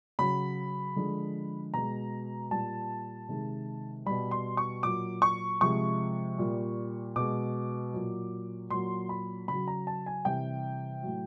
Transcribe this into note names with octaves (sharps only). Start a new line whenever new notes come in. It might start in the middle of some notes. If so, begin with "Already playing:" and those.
C#3 F#3 B5
D3 F3 G#3
B2 G#3 A#5
A#2 G3 A5
C3 D#3 G#3
B2 G3 B5
C6
C#6
A#2 F#3 D6
C#6
C3 F3 G#3 C#6
A#2 G3
B2 G#3 D6
A#2 F#3
A#2 F#3 C6
B5
C#3 F#3 B5
A#5
A5
G#5
C3 E3 G3 G5
A2 F#3